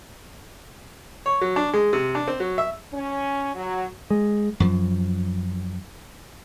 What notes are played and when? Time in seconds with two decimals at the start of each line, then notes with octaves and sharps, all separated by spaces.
1.26 C#5
1.41 F#3
1.56 D4
1.73 G#3
1.93 C3
2.15 D4
2.28 C4
2.40 F#3
2.58 E5
2.94 C#4
3.55 F#3
4.10 G#3
4.60 F#2 F3